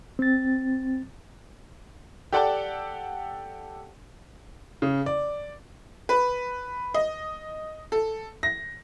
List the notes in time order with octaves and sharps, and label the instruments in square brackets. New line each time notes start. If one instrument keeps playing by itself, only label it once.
[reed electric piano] C4 A6
[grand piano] G4 A4 D5 F#5 G5 A5
[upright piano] C#3
D5
[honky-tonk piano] B4
D#5
A4
A#6